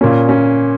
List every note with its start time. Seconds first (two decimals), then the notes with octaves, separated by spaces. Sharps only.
0.01 A#2 A#3 C#4
0.29 C#4